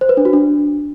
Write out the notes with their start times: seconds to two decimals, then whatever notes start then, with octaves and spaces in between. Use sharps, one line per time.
0.01 C5
0.09 B4
0.17 D4
0.25 F#4
0.33 D4